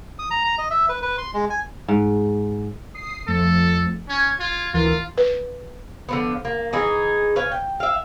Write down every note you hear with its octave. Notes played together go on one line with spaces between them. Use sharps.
D#6
A#5
A#5
D#5
E5
B4
B4
C6
G#3
G#5
G#2
D#6 C7
F2 F3 A3 A4
C#4 G#6
F4
D2 E3 F4 A#4
B4
D3 F3 B3
A#3
E3 D#4 G#4
B4 C#5 F5 G#5
G5
E5 F5